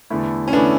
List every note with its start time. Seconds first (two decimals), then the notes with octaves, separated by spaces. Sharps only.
0.10 E2 D3 A3 E4
0.48 C#4
0.53 E2 D3 A3 B3 D4 E4